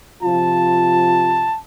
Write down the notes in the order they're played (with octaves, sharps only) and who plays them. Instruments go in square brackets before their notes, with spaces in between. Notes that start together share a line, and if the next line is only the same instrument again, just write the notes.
[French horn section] C3 F3 F4 [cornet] A5